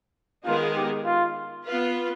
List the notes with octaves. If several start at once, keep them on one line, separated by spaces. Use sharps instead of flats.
D#3 G#3 B3 D#4 F4 G#4
G4
F4
B3 F4 B4